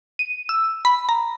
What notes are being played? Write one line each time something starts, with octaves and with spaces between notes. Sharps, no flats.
D#7
E6
B5
A#5